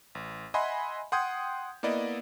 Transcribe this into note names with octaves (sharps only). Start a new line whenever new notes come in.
A1
D#5 E5 F#5 G#5 B5 C6
F#5 G5 C6 D#6 G6 G#6
A#3 B3 E4 D5 D#5